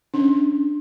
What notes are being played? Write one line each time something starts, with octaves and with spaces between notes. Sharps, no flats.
C#4 D4